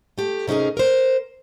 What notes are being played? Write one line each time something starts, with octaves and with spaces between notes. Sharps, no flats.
A3 G4
C3 C#4 D#4 G#4 A#4
A#4 C5